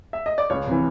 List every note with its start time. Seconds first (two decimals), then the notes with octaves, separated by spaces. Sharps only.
0.13 E5
0.26 D#5
0.38 D5
0.50 C#2 C#5
0.67 C3 E3